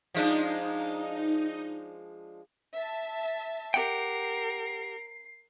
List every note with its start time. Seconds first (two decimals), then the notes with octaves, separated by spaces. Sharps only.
0.14 F3 G#3 D4 D#4
2.72 E5 A5
3.74 G4 A#4 F#5 G5 C7